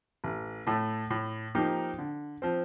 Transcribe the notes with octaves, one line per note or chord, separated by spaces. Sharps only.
A1
A2 A3
A2
F3 A#3 D#4 G4
D3
F3 C4